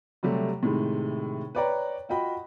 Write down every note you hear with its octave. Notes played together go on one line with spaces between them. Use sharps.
C3 F#3 G3 A3
A2 C3 D#3 G#3
B4 C#5 D5 G5 A#5
F4 F#4 D#5 G5 B5